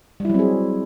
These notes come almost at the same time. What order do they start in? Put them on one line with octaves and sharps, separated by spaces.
G3 E4 F#3 C4 G#4